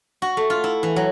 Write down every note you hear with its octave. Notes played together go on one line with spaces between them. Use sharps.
F#4
A3
F4
E4
E3
F#3